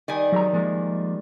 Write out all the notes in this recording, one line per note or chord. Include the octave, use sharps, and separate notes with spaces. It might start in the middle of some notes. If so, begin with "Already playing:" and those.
D#3 G3 G#5
F#3 G#4 A#5
F3 G#3 A#3